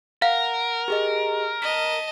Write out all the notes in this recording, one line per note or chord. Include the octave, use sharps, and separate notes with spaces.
A#4 F5 F#5
G4 G#4 D#5
D#5 A5 B6